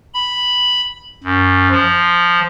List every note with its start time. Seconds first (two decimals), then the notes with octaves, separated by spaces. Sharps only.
0.14 B5
1.24 F#2
1.71 F3